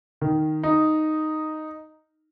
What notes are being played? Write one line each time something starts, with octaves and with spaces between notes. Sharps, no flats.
D#3
D#4